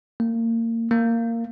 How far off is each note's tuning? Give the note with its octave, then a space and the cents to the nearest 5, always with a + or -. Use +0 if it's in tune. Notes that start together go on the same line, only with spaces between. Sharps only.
A#3 -30
A#3 -15